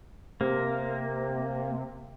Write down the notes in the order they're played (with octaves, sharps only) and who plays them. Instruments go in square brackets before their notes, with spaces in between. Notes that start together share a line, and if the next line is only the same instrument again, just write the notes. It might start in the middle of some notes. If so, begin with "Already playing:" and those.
[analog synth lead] C3 [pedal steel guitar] A#3